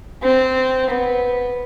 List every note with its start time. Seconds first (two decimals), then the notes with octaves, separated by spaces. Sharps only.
0.23 C4
0.91 B3